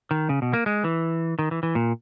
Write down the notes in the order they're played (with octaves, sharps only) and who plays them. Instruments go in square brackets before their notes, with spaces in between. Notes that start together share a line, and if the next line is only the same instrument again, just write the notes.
[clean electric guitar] D#3
C#3
B2
A#3
G#3
E3
D#3
E3
E3
A#2